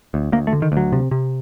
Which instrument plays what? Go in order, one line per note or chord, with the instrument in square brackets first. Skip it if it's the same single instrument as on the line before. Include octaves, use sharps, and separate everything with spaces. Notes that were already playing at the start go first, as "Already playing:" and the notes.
[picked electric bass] D2
D2 A#3
A3
D3
D#3
D2 F#3
C3
C3